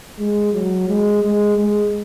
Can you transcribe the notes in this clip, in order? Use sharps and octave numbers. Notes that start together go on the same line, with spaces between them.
G#3
F#3
G#3
G#3
G#3